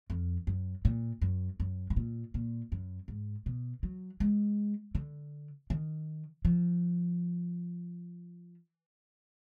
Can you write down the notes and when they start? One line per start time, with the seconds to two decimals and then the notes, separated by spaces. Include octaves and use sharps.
0.10 F2
0.47 F#2
0.85 A#2
1.22 F#2
1.60 F#2
1.90 G#2
1.96 A#2
2.34 A#2
2.72 F#2
3.08 G#2
3.46 B2
3.83 F#3
4.20 G#3
4.95 D3
5.70 D#3
6.45 F3